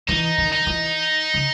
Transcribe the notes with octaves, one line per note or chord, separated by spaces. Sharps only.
E3 D#4
D#3
D#4
E3
C#3